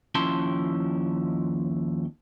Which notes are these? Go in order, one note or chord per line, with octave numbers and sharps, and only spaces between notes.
D#2 F3 C#4 E4 A5 C6